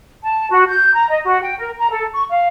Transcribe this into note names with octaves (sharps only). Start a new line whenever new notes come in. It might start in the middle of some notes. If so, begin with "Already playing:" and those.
A5
F#4
G6
A#5
D#5
F#4
G5
A#4
A#5
A4
C#6
F5